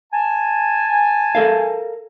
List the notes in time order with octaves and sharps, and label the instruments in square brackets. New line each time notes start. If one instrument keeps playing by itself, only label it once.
[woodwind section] G#5 A5
[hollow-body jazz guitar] A4 A#4 F5